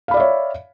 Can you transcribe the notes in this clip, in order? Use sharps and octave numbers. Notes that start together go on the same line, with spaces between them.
C#5 D5 E5 F5 B5